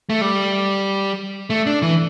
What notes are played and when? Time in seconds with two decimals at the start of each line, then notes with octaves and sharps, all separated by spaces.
0.10 A3
0.21 G3
1.50 A3
1.66 D4
1.82 E3